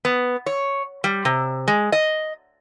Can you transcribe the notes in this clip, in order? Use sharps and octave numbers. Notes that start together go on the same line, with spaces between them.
B3
C#5
G3
C3
G#3
D#5